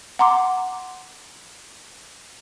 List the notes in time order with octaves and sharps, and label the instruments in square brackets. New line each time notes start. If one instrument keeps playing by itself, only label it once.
[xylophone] F#5 A#5 C6 D6